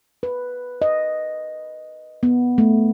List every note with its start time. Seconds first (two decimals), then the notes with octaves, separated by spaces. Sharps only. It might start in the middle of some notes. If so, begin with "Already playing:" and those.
0.23 B4
0.82 D#5
2.23 B3
2.58 A3